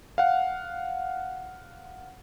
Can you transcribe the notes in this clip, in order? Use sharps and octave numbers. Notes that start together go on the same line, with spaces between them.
F5 F#5